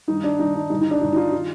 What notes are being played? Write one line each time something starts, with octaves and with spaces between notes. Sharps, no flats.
G2 D#3 D#4
D4
G2 D#3 D#4
D4
G2 D3 D#4
D#4
D4
G2 D3 D#4
D#4
F4
D#3 F4